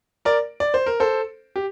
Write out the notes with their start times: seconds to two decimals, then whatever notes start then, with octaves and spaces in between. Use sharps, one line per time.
0.25 A#4 D5
0.60 D5
0.74 C5
0.86 A#4
1.00 A4 C5
1.56 G4